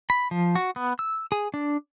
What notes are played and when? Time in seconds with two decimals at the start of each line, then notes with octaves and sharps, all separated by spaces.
0.10 B5
0.31 F3
0.55 F#4
0.76 B3
0.99 E6
1.32 G#4
1.54 D4